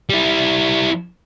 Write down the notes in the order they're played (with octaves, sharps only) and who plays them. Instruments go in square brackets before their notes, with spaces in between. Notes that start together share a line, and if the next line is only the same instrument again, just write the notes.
[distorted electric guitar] G3 E4